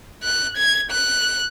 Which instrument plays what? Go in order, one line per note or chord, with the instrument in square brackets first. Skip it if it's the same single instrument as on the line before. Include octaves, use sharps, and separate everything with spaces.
[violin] F#6
G#6
F#6